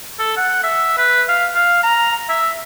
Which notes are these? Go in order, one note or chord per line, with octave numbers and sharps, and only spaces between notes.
A4
F#5
E5
B4
F5
F5
A#5
E5